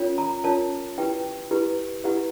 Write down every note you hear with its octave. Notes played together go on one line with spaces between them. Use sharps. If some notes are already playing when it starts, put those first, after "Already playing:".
Already playing: C#4 F4 A#4 C#5
A#5
C#4 F4 A#4 C#5 A5
E4 G4 B4 G5
E4 G4 B4
E4 G4 B4 F#5